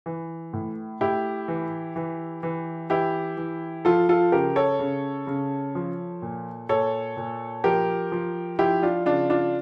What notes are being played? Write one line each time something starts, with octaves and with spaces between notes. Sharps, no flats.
E3
A2
A2 E4 G4
E3
E3
E3
E3 E4 G4
E3
F3 F4 A4
F4 A4
C#3 G4 A#4
A4 C#5
C#3
C#3
F3
A#2
A#2 A4 C#5
A#2
F3 G4 A#4
F3
F3 E4 G4
D4 F4
C#3 D4 F4
D4 F4